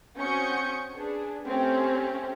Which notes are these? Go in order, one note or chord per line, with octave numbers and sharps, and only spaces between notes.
C4 C#4 F#4 C#6 D#6 G6
D4 G#4 B4
A3 C4 C#4 G4